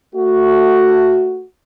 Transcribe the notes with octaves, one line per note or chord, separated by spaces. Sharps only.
A3 F#4